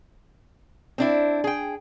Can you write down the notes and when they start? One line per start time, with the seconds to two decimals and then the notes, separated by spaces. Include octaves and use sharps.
0.98 C4 D4 E4
1.44 G#4 G5